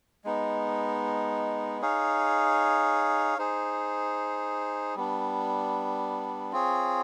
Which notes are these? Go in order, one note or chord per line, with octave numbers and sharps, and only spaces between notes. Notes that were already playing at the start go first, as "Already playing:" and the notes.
G#3 B3 D#4
D#4 G#4 C#5 F5
D#4 G#4 C5
G3 B3 D4
C4 F4 G#4 C#5